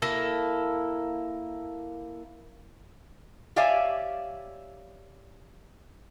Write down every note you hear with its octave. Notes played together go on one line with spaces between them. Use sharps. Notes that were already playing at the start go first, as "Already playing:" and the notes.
A#3 E4 A4
G4 C#5 D5 E5 F5 G#5